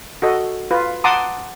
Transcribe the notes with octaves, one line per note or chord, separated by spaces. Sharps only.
F#4 A4 D#5
F4 B4
F#5 A5 A#5 C6 D6 D#6